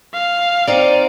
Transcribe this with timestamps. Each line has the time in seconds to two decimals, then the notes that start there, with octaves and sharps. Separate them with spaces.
0.14 F5
0.67 C4 D#4 D5